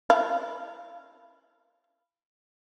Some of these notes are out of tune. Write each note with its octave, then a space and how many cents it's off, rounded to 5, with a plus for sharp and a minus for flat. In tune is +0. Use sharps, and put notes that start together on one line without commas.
E4 +0 F5 -20